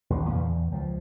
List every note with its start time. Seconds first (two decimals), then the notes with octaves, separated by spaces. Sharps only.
0.10 A1 D#2
0.29 F2 A#2 C#3 E3
0.43 E2
0.71 C#2 F3